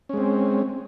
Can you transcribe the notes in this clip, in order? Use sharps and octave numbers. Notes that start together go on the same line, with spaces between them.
G#3 C4 C#4